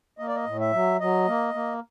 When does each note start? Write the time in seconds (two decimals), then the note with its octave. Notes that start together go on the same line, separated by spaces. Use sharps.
0.19 A#3 D#5
0.28 D5
0.35 D#5
0.46 A2
0.60 E5
0.73 F#3
1.00 F#3 D#5
1.27 A#3
1.54 A#3